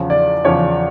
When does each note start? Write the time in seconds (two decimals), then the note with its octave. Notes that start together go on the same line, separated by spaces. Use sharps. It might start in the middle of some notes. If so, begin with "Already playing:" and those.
Already playing: E2 C#3 F3
0.10 D5
0.45 E2 C#3 F3 C#5